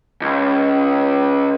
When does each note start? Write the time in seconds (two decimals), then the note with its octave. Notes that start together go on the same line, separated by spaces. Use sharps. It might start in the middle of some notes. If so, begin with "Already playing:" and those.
0.21 C#2